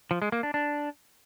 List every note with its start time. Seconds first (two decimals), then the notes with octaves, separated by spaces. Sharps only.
0.11 F3
0.22 G#3
0.32 A#3
0.43 D4
0.54 D4